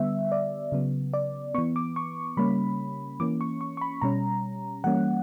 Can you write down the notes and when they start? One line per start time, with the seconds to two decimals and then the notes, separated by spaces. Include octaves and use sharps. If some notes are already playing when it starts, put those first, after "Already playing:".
Already playing: D3 G3 B3 E5
0.32 D5
0.72 C#3 F#3 B3
1.13 D5
1.54 B3 C#6
1.58 E3
1.76 D6
1.96 C#6
2.37 C#3 G3 A#3 C#4 B5
3.20 E3 A#3 C#4 D6
3.41 C#6
3.61 C#6
3.77 C#6
3.81 B5
4.02 B2 G3 C#4 A#5
4.84 E3 G3 A#3 C#4 F#5